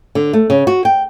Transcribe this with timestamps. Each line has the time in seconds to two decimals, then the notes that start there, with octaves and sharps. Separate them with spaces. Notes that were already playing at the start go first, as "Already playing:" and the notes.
0.15 D3
0.33 A3
0.50 C#3
0.67 F#4
0.85 G5